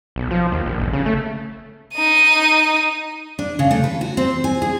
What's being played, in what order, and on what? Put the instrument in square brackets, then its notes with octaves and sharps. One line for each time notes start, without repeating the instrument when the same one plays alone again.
[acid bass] B1
F3
D#2
A#1
G1
C#3
A3
[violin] D#4 D#7
[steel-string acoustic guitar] D4
C#3
A3
B4
F#4
C4
G#5
G#4